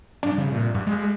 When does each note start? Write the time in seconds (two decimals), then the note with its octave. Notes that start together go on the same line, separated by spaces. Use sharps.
0.23 G2 C3 F3 D4
0.38 C#3
0.52 A#2
0.74 G2 F#4
0.87 B2 G#3 A#3